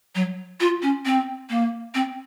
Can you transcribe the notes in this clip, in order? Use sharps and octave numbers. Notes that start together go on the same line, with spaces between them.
F#3
F4
C#4
C4
A#3
C4